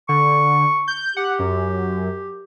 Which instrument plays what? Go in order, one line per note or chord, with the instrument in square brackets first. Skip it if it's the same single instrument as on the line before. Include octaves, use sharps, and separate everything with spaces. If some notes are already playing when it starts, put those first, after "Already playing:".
[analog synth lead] D3 [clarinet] C#6
[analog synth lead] G6
[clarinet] G4 [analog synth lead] F#5
[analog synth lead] F#2